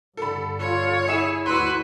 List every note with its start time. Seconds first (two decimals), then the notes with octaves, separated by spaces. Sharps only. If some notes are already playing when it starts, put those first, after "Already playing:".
0.17 G2 D3 A4 B5
0.59 F4 C#5
1.08 E4 G#4 E5 E7
1.46 D2 F#4 B4 C6 E6